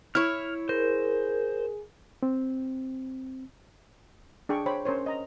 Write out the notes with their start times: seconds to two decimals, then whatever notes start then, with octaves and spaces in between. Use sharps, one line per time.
0.15 E4 C#5 F6
0.69 G#4 A#4 C5
2.23 C4
4.49 D4 G#4 G5 C#6
4.66 C5 C#5 G5 B5
4.85 C#4 A#4 C5 C#5
5.06 D#5 A#5